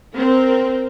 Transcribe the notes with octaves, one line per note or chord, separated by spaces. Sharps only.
C4 A#4